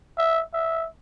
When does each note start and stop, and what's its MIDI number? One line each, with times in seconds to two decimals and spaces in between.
0.18 0.43 76
0.54 0.87 76